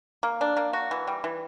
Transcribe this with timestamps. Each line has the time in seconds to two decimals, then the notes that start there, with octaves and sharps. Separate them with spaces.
0.23 A#3
0.41 D4
0.57 A#3
0.73 F#4
0.91 E3
1.07 G3
1.24 E3